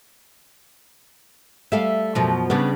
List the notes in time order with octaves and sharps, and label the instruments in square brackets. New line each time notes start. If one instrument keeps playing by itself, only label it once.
[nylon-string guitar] G3 A3 [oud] E5 F5
[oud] F#2 B2 F3
[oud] C#3 G3 D4 [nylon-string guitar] B3